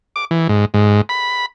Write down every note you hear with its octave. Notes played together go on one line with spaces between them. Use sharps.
D6
E3
G#2
G#2
B5